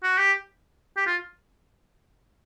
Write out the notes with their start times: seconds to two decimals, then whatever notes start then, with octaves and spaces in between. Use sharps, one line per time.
0.03 F#4
0.18 G4
0.97 G4
1.06 F4